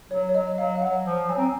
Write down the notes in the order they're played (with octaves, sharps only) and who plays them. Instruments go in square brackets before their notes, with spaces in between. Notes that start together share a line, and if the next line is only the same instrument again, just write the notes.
[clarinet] F#3 [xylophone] C#5
[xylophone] C#5
[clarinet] F#3 [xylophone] D#5
[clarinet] F#3 [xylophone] F5
[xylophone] F5
[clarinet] F#3 [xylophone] F#5
[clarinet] F3
[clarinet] F#3 [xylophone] G#5
[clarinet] C4 [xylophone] A#5
[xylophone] G#5